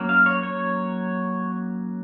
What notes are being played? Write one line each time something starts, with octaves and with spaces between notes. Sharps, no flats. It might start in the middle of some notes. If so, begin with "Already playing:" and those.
Already playing: F#3 A#3 C#4
F5
C#5
C#5